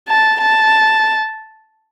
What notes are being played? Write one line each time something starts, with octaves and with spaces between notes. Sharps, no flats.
A5
A5